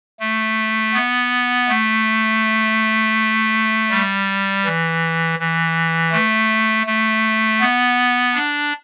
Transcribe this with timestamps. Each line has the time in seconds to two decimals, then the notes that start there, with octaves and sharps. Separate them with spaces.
0.20 A3
0.94 B3
1.69 A3
3.90 G3
4.65 E3
5.39 E3
6.12 A3
6.87 A3
7.61 B3
8.34 D4